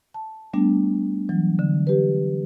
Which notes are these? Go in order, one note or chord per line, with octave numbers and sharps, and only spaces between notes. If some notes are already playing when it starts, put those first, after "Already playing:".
A5
G3 A3 B3 D4
E3 F#3
D3
G4 B4